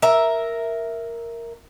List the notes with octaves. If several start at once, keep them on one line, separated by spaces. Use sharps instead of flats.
A#4 E5